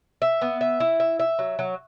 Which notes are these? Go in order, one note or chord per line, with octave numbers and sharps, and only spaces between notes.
E5
B3
E5
E4
E5
E5
F#3
F#3